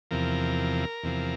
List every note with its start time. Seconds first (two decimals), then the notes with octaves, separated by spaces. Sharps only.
0.11 E2 C3 F3 A#4
1.03 E2 C3 F3